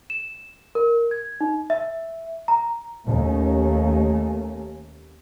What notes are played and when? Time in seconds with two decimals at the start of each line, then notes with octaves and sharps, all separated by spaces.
0.10 E7
0.75 A#4
1.11 G#6
1.41 D#4
1.70 E5
2.48 A#5
3.07 D#2 A3 A#3 C#4